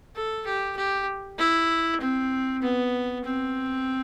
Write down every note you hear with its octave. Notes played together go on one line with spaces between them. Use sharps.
A4
G4
G4
E4
C4
B3
C4